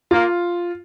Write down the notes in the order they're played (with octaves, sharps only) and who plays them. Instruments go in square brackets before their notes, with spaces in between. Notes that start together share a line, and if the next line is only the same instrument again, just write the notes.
[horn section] A#3 [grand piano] F4